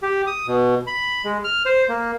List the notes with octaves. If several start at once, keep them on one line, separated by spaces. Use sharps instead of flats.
G4
D#6
B2
B5
G#3
F6
C5
A#3